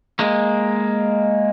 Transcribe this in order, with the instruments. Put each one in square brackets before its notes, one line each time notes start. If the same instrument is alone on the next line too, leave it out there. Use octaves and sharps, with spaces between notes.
[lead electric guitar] G#3 A#3